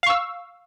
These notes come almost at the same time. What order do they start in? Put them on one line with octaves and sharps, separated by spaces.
F5 C#6 E6